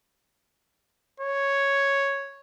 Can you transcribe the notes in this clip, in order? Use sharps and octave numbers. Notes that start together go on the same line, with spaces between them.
C#5